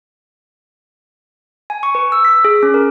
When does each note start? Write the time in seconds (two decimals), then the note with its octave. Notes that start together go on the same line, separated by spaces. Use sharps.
1.70 G#5
1.83 C#6
1.95 B4
2.12 E6
2.25 B6
2.45 G#4
2.63 C#4
2.74 A#4